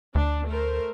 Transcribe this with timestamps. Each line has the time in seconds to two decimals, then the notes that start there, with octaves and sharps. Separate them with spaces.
0.15 D2 D4
0.48 A3 A#4 C5